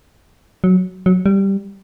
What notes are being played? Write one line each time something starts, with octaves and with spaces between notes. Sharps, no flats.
F#3
F#3
G3